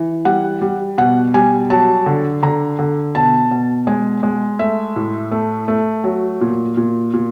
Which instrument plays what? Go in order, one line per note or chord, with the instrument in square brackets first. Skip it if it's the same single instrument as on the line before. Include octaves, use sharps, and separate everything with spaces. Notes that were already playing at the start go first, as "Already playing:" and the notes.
Already playing: [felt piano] E3
G3 F#5
G3
B2 F#5
G3 G#5
F#3 A5
D3
D3 A#5
D3
B2 A5
B2
G#3 G#5
G#3
A3 E5
A2
A3
A3
F#3
A#2
A#2
A#2